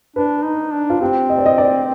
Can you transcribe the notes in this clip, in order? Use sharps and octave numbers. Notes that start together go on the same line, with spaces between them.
D4 B4
D#4
D4
F4
C4 G4
D#5
D5
D#5
D5